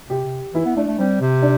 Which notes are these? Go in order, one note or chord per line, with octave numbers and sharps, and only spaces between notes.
C3 G4
C3
E3 E4
B3
A3 D4
A3
G3 C4
C3
D4